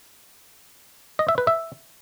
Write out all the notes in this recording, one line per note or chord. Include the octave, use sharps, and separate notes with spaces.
D#5
E5
B4
E5